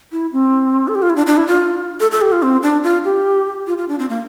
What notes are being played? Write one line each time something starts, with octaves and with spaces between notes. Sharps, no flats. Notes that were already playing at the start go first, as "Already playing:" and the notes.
E4
C4
A4
G4
F4
E4
D4
D4
E4
F4
A4
A4
G4
F4
C4
D4
F4
G4
F4
F4
D4
C4
A#3